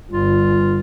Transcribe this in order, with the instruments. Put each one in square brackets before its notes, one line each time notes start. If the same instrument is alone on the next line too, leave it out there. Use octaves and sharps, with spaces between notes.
[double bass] G1 [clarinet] F4